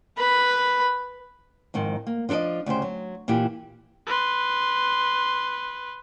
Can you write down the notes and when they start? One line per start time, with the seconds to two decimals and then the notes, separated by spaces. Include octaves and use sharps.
0.17 B4 B5
1.74 F2 G#2 D#3
2.07 A#3
2.29 F3 D4 A4 D5 D#5
2.66 D2 C#3 G4 C5
2.82 F#3
3.28 A#2 E3 E4 G4
4.06 B4 C6